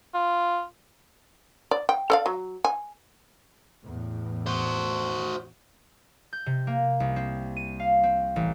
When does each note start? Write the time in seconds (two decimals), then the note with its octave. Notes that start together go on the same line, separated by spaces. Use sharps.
0.14 F4
1.71 D5
1.89 G5
2.10 A4 D5 F5
2.26 F#3
2.64 G#5
3.83 E2 A2
4.46 F#4 C5
6.33 G6
6.46 C3
6.67 A#3
7.00 C2
7.16 C4
7.56 D#7
7.80 F5
8.03 C4
8.36 A1